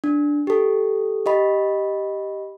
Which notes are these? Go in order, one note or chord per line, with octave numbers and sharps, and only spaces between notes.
D4
G4 A4
G4 D#5 B5